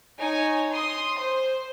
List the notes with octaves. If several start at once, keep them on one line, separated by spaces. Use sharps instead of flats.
D#4 C#5 G#5
C6 D#6
C5